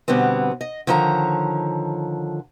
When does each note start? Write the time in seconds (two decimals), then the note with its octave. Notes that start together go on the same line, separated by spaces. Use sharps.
0.08 B2 D3 G3 B3 C4
0.61 D#5
0.87 D3 D#3 F3 C#5 D#5 A#5